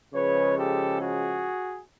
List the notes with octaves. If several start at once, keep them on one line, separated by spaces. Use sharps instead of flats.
C#3 F3 G#3 B4 C#5
G4 A4
F#4 G#4